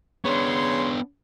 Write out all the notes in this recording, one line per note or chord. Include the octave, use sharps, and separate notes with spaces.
C#3 B3 D4 C#5 C6